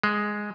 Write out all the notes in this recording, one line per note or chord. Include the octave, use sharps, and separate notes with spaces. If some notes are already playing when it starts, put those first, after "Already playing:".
G#3